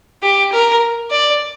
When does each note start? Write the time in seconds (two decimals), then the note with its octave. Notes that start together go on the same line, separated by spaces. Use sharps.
0.22 G4
0.52 A#4
1.11 D5